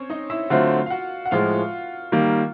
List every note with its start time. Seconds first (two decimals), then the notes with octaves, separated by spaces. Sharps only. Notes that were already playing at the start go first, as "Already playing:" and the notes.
Already playing: C4 C#4 C5 C#5
0.10 D#4 D#5
0.30 E4 E5
0.50 D3 F#3 A3 C4 F4 F5
0.86 F5
0.90 F#4 F#5
1.26 F#5
1.31 A2 F3 G#3 F4 F5
2.12 D#3 G3 A#3